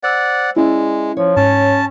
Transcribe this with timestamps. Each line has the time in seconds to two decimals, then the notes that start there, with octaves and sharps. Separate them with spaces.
0.03 C5 D5 F#5 E6
0.56 G#3 C#4 E4 D5 E5
1.17 F3 C#5
1.36 G#2 C#4 A5